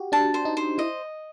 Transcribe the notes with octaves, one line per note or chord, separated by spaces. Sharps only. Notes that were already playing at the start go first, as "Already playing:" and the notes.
Already playing: F#4 G4
D4 A5
C5
D#4
C5
E4 D#5